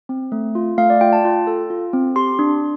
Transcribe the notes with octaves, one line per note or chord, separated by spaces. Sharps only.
C4
A3
F4
A3 F5
D5
F4 G5
A5
F4
A4
F4
C4
G4 C6
D4